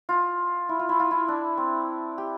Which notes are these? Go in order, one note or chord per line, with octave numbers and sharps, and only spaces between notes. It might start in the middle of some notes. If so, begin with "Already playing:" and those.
F4
E4
F4
E4
F4
E4
D4
C4
G4